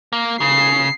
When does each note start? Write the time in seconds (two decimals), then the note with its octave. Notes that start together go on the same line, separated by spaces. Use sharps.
0.13 A#3
0.41 C#3 C7